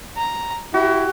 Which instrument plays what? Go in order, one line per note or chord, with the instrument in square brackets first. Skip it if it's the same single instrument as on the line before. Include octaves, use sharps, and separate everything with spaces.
[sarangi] A#5
[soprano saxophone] E4 [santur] F#4 [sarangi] G4